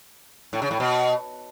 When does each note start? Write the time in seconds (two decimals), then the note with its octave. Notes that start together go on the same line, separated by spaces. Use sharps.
0.53 A2
0.62 C#3
0.71 A2
0.80 B2